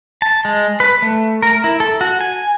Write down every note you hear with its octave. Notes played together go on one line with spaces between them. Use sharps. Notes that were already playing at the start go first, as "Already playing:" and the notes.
A5
G#3
B4
A3
A#4
E4
A4
F#4
G#5